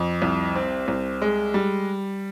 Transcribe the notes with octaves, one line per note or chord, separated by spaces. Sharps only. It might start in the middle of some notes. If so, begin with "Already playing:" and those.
Already playing: F2
C2
C4
C2
G#3
G3